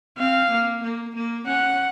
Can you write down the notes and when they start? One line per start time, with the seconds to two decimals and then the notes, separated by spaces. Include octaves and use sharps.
0.18 C4 F5
0.51 A#3
0.83 A#3
1.15 A#3
1.47 C#4 F#5